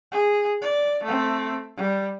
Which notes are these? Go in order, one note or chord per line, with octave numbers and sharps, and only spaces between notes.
G#4
D5
A3 C4
G3